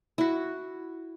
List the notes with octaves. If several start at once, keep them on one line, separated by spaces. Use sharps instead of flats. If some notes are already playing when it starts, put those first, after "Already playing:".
E4 F#4